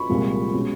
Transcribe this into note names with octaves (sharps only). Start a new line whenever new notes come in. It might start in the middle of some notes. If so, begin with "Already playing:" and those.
Already playing: B5 C#6
C2 A#2 F3 G#3
B2 G#3 C#4